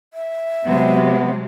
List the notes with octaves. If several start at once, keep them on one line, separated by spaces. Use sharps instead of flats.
E5
C3 F#3 G#3 B3